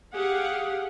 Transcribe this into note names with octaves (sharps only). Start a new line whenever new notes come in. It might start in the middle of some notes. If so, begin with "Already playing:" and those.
G4 G#4 F5 F#5